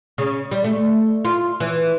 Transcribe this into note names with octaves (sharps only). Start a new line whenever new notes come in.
C#3
G3
A3
F4
E3